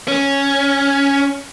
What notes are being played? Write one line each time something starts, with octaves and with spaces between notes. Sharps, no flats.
C#4